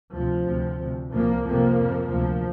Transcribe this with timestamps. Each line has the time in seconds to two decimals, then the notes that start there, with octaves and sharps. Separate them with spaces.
0.14 D2 C3 F3
0.47 D2 C3
0.79 D2 C3
1.12 C2 A#2 F3 A#3
1.45 F2 C3 F3 A#3
1.78 F2 C3
2.10 D2 C3 F3